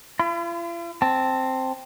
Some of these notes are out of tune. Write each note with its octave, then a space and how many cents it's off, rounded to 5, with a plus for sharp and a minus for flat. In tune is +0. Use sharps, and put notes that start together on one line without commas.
F4 -45 B5 +40
C4 +0 A5 +0